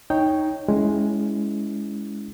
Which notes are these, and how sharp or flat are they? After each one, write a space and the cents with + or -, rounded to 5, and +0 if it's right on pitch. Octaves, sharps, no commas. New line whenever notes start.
D#4 +0 C#5 +0 G5 +0
G#3 +10 C#4 +20 E4 +0